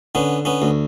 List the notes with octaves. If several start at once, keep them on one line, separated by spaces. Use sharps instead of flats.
D3 B3 C#4
B3 C#4
D2